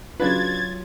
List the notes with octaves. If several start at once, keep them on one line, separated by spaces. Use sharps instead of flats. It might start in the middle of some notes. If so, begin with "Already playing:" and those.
C#3 F#3 D4 F4 B4 G#6 A6